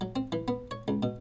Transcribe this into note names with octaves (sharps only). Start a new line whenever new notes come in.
F#3
C4
E3
B3
C#5
C#2
B2